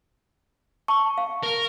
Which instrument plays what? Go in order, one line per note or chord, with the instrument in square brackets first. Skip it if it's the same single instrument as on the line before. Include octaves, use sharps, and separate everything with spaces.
[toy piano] A5 [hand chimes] C#6
[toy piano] F5
[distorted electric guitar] A#4